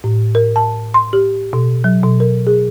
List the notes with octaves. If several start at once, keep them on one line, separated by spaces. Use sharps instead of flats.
A2
A#4
A5
C6
G4
B2
F#3
B2
A#4
G#4